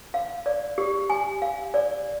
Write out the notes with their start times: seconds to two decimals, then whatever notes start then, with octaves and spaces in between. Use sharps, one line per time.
0.14 F5
0.46 D5
0.78 G4
1.10 G#5
1.42 F5
1.74 D5